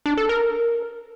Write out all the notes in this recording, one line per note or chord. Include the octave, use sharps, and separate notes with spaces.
D4
A4
A#4